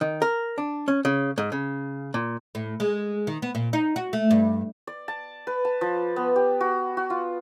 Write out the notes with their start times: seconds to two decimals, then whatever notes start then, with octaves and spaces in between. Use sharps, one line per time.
0.01 D#3
0.22 A#4
0.58 D4
0.88 C#4
1.05 C#3
1.38 G#2
1.52 C#3
2.14 A#2
2.55 A2
2.80 G#3
3.27 D#3
3.42 B3
3.55 A#2
3.73 D#4
3.96 F#4
4.13 A3
4.31 G2
4.87 D5
5.08 A5
5.47 B4
5.65 A5
5.81 F3
6.16 B3
6.36 G4
6.61 F#4
6.97 F#4
7.10 F4